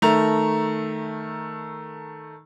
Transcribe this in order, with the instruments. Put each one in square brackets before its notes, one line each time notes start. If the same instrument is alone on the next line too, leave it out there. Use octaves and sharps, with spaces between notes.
[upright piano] D#3 A3 A#5 F7